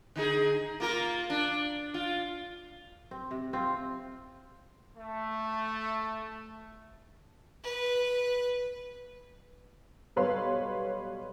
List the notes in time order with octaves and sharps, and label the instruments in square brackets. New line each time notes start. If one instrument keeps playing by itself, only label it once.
[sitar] D3 D#4 G#4
A#3 F4 A#4
D4
F4
[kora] C4
C3
C4 F4
[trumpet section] A3
[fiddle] B4
[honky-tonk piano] B1 G3 B4 C#5 F5 C6